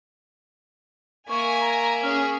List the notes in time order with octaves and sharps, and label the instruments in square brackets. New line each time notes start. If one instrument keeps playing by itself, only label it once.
[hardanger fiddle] A#3 E5 [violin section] G#5 [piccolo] C#6
[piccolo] A#5
[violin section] C#4 G#4 [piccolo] F6